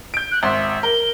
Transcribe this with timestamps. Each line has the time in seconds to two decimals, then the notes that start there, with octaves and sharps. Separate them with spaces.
0.14 G6 D7
0.31 F#6
0.43 G#1 E5 C6
0.83 A#4 G7